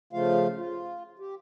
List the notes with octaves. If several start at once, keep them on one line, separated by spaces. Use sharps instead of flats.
C#3 F3 A3 F4 F5
F4
G4